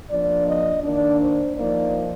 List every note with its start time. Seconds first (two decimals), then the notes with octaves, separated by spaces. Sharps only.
0.11 F3 A#3 D4 D5
0.47 D#5
0.84 D#3 A#3 D4 D5
1.20 C5
1.56 F3 A#3 D#4 D5